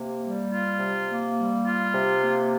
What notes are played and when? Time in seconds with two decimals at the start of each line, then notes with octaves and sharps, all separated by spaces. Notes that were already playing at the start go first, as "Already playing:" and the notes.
Already playing: C3 A#3
0.22 G3
0.51 F4
0.79 C3
1.08 A#3
1.37 G3
1.66 F4
1.94 C3
2.22 A#3